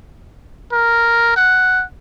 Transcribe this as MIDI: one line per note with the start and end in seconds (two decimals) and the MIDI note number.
0.72 1.32 70
1.36 1.83 78